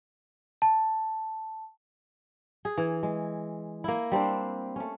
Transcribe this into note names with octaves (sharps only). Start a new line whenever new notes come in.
A5
G#4
E3
G#3
A#3 E4
G3 C4 D4 C5
A3 C#4